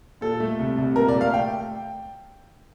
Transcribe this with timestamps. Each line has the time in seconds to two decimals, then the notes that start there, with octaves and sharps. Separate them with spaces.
0.21 A#2 A4
0.40 A3
0.59 C2
0.78 C2
0.96 A#2 A#4
1.08 D5
1.15 A3
1.21 F5
1.34 G5